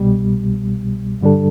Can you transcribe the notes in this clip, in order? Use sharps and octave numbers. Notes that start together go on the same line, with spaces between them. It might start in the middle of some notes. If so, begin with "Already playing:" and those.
Already playing: C2 B2 G3
G2 D3 G3 D4 A4